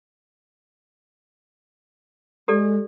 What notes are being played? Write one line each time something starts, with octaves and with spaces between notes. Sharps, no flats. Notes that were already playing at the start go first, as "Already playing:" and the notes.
G#3 G4 A4 D5